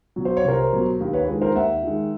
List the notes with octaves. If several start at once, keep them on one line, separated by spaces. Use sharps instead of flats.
B2 F#3
C5
C#5
C2 A#4 C5
B2 F#3
D#2
B4 C#5
D#3 G#3
A#4 C5
D#2 E5 F#5
D#3 G#3